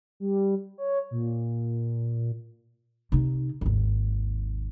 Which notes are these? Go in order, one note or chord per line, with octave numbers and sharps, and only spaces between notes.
G3
C#5
A#2
C3 D#4
G#1 D#2